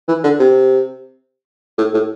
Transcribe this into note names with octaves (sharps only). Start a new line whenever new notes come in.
E3
D3
C3
A2
A2